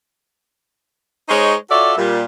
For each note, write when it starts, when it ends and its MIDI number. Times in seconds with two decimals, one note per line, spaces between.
1.29 1.55 56
1.29 1.55 63
1.29 1.55 72
1.29 1.55 73
1.71 1.93 65
1.71 1.93 66
1.71 1.93 69
1.71 1.93 73
1.71 1.93 74
1.71 1.93 76
1.98 2.24 46
1.98 2.24 55